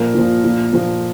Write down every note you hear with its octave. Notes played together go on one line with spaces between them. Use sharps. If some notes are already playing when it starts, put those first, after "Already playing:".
Already playing: A#2 F3 A#4
A#2 F3
A#2 F3
A#2 F3